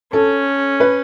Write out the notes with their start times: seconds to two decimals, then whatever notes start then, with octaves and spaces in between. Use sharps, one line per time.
0.13 C#4 A4
0.80 B4